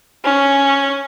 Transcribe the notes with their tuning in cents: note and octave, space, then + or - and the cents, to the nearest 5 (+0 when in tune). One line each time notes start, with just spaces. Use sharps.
C#4 +0